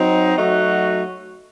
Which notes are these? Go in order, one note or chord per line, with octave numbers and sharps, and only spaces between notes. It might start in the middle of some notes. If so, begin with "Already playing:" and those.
Already playing: F#3 C4 D#4
F#3 A3 D#4 F#4